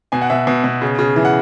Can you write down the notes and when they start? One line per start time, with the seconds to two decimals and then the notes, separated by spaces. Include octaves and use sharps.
0.12 B2 G#5
0.22 F#5
0.30 B2 E5
0.47 B2
0.64 B2
0.82 C#3
0.99 C#3
1.16 E3
1.25 F#5